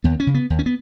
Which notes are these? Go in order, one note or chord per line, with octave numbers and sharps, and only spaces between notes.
D#2 B3
C#4
C#3
B3
D#2
C#4
B3